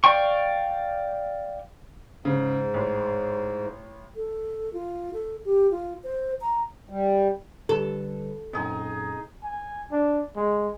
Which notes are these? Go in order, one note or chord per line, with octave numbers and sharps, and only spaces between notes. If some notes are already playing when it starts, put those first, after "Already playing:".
D5 F5 G5 C#6
G#2 C#3
A1
A4
F4
A4
G4
F4
C5
A#5
G3
D3 G3 A4 B4
F#2 A#2 C4 D#4 G#4 D#5
G#5
D4
G#3